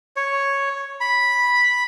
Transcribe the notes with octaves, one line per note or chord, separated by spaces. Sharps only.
C#5
B5